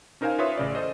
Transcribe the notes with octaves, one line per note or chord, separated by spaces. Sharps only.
C#4 D#4 A#4 C5 F5 G#5
F4 B4 C#5 E5 D#6
A1 C#3 D5
A4 C5 D#5